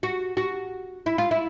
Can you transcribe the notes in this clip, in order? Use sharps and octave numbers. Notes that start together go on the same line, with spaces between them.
F#4
F#4
E4
F4
E4